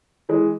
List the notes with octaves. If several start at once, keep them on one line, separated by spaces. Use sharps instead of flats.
E3 G#3